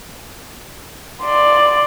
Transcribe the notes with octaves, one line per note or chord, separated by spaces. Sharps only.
D5 C6